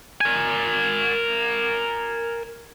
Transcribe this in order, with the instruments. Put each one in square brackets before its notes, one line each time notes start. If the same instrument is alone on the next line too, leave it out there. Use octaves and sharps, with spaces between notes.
[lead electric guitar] A#4 G#5